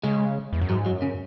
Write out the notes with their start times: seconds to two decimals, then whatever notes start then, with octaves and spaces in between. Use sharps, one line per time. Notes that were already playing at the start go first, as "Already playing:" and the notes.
0.04 C#3 G#3
0.53 E2
0.62 F#2
0.69 G#2 F#3
0.86 F#3
0.91 F#2
1.02 C#3